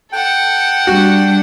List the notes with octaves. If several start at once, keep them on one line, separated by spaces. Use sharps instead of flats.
A4 F#5 G5
G3 D4 F#4